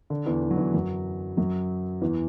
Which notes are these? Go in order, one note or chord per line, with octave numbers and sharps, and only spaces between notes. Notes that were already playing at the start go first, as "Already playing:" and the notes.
D3
E2 E3
E3
F#3
E2 E3
F#2 F#3
F#2 F#3
E2 E3